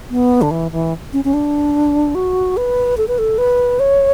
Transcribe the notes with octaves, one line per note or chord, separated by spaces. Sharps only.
B3
D3
E3
E3
C#4
C#4
D4
F#4
B4
A4
B4
A4
B4
C#5